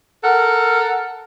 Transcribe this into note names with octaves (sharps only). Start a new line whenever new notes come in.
A4 A#4 F#5